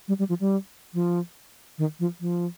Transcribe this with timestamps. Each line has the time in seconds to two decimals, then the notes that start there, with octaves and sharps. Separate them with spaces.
0.08 G3
0.19 G3
0.29 F3
0.40 G3
0.94 F3
1.78 D#3
1.99 F3
2.20 F3